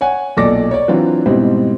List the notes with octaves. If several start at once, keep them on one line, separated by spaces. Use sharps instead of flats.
C#5 F#5 G#5
B1 A#2 A4 D5 D6 A#6
C#5 D5
E3 F#3 C4 D4 F4
G#2 B2 G3 C4 E4